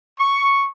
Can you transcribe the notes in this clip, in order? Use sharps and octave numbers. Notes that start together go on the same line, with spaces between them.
C#6